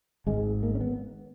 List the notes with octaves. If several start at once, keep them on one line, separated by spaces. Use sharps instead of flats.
G#1 G#2 G#3
A#3
C#4
B3